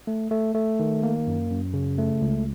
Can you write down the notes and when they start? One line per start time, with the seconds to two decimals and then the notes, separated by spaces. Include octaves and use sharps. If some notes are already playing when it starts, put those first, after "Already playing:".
0.07 A3
0.31 A3
0.54 A3
0.79 D#3
1.03 A#3
1.27 F#2
1.51 F#2
1.74 C#3
1.98 A3
2.22 C#2